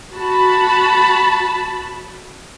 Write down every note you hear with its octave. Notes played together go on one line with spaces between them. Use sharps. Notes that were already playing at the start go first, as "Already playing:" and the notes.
F#4 A5 B5